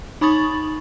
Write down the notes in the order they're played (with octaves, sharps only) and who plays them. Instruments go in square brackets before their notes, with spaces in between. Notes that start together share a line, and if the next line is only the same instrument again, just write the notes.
[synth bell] D#4 B5 C#6 D#6 A6 F#7